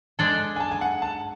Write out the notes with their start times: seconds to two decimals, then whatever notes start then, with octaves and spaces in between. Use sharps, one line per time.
0.19 G#3 D4 A4 D5 A5
0.56 G#5
0.60 A5
0.71 G#5
0.81 F#5
1.02 A5